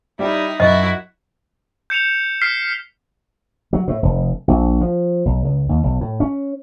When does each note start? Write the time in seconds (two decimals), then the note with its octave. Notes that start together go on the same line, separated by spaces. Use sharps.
0.19 G3 D#4 E4 G4
0.60 F#2 E4 F#4 D#5
1.90 G6 C#7 E7 F7
2.42 F6 B6 C7
3.73 F#3
3.88 A2
4.03 F1
4.48 A#1
4.81 F3
5.25 B1
5.45 C#2
5.69 D#2
5.84 B1
6.01 A2
6.20 C#4